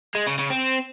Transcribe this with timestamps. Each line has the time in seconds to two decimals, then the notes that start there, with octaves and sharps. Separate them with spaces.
0.15 G#3
0.27 C#3
0.38 C#3
0.50 C4